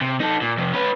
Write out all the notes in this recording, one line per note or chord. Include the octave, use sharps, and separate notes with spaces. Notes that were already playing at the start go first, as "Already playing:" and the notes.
C3
D#4 A4
A#2
F2 C3
C#4 B4